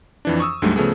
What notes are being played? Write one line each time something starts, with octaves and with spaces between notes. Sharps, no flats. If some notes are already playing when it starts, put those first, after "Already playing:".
F2 E3 D4
C#6 D#6 E6
D2 G#2 D3 F#3 G3 A3
C#3 F3 A3 B3 G#4